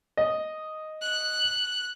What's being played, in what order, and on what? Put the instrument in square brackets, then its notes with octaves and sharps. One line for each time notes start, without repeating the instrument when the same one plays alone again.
[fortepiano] D#5
[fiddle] F#6